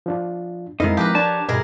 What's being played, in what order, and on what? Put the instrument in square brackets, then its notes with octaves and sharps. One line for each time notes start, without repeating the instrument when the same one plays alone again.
[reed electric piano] F3 D4 F4
[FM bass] F2 [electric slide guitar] G#3 D#4 [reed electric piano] C4 E4 B5 [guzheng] A#4 F5
[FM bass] F3 [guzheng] G4 A#4 B4
[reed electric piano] D4 [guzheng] C#5 [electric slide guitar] A5
[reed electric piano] G2 [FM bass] B2 [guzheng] E4 G#4 A#4